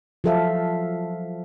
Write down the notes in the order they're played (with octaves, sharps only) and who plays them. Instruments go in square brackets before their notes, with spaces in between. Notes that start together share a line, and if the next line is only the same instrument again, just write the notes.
[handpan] F3 F#3 A4 C5 E5 F5